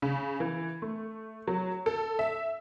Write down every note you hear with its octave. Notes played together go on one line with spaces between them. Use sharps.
C#3
E3
A3
F#3
A4
E5